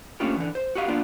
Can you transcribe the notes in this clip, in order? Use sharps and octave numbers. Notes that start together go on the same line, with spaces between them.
A3 A#3 C#4 D4 F4 G4
D3 E3
C5
F#4 G4 D#5 F5
A#3 B3 D4 F4